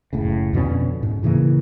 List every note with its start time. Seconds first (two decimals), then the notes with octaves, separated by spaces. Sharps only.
0.13 F#1 A2 C#3
0.53 F2 B2 D3 C#4
1.03 G#2
1.23 A2 C#3 E3 A#3